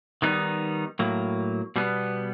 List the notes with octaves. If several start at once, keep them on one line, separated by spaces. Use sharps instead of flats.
D#3 G3 B3 D#4
A2 F#3 A#3
B2 G3 B3